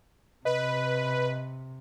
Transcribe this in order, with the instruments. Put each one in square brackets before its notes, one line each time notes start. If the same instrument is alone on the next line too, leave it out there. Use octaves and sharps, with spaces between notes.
[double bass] C3 [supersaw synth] B4 [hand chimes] D#5